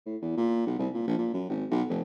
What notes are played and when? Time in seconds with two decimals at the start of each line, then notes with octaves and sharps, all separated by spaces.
0.06 A2
0.22 E2
0.37 A#2
0.66 B1
0.79 C2
0.94 A#2
1.07 A#1
1.18 A#2
1.34 F#2
1.49 G#1
1.71 B1
1.89 F1